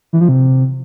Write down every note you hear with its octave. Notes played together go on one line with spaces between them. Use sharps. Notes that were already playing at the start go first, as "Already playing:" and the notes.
E3
F3
C3